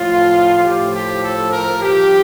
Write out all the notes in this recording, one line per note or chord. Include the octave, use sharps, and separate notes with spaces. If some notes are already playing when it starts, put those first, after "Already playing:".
Already playing: A2 F3 F4
A2 F3 G4
G4
A4
A#4
G2 F3 G4